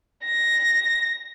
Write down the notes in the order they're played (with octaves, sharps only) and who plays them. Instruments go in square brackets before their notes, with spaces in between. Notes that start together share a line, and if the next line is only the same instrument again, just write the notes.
[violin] A#6